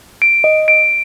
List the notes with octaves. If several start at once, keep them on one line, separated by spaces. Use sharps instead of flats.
D7
D#5
D7